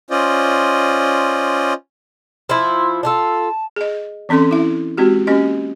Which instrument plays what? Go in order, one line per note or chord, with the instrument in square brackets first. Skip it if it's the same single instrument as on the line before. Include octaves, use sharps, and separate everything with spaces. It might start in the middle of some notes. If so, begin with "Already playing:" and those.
[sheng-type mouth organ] C#4 F4 C5 D5 D#5
[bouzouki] F3 E4 [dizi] C6
[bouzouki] D4 F4 A4 [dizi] A5
[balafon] G#4 D#5
E3 C4 C#4 A4 C6
E4 E5
G#3 C4 F#4 G4
A#3 C#4 G4 D#5